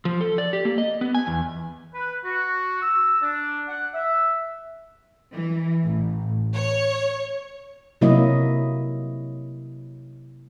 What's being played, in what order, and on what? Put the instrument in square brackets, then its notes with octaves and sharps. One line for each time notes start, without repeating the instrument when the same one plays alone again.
[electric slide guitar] F3
A4
D5
G4
A#3
D#5
B3
G#5
E2
[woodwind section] B4
F#4
E6
D4
F#5
E5
[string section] E3
A1
C#5
[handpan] C3 F#3 A#3 E4 D#5